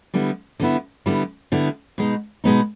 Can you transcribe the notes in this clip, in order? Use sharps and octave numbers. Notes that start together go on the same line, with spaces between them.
D3 G3 B3 E4
D3 G3 B3 E4
D3 G3 B3 E4
D3 G3 B3 E4
B2 G#3 B3 D#4
B2 G#3 B3 D#4